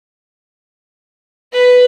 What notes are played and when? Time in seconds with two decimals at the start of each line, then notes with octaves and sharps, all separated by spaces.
1.52 B4